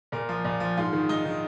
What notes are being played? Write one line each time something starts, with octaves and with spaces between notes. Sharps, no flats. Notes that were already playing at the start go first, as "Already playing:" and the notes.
A#2 A#4
F3
A#2
F3
G#2 F4
D#3
G#2 D#4
D#3